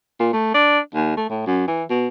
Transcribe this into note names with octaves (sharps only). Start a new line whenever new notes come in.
A#2
A3
D4
D#2
A3
A2
F#2
E3
B2